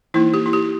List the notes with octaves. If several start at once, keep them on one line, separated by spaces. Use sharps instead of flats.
E3 A#3 D#4 E4
G4
E4
G4